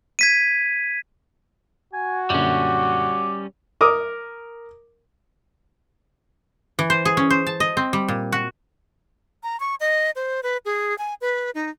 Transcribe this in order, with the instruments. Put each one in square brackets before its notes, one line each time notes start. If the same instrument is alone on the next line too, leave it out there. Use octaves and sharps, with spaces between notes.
[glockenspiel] G#6 B6 D#7
[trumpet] F#4 [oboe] G#5
[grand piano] F#2 A#2 D3 [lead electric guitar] G3 C#4 [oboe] D6
[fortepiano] A#4 D6 D#6
[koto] E3
C5
G#4
C#4
C5
A5
D#5
C4
G3
A#2
F#4
[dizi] A#5
C#6
D#5
C5
B4
G#4
G#5
B4
D#4